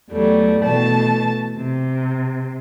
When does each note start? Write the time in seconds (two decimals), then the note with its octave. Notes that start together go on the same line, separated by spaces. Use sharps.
0.10 E2 F#3 G3 A3
0.61 B2 E3 A3 A5 A6
1.57 C3